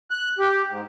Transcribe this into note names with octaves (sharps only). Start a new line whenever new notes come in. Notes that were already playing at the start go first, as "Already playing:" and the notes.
F#6
G4
G#2